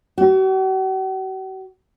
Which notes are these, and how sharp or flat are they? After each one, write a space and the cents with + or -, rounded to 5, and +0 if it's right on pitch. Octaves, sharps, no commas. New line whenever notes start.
F#4 +45